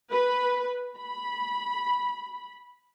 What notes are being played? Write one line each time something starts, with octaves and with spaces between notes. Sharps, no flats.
B4
B5